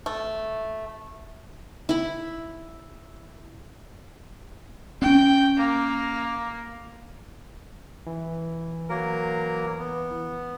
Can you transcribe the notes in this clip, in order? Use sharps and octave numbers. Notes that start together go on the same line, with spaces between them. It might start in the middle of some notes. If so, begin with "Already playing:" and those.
A3
E4 B5
C4 C#4 G5
A#3
E3
F#3 A#3 A#4
B3